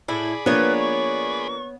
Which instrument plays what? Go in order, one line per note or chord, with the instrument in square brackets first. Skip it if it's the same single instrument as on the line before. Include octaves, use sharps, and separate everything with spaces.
[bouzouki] A2 E4 [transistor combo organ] G#4 D5 B5
[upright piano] F3 A#3 D4 [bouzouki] B3 C#5 [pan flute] B4
[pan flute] C#6